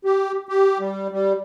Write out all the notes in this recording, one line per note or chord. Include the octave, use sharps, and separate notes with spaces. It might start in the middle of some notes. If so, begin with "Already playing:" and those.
G4
G4
G3
G3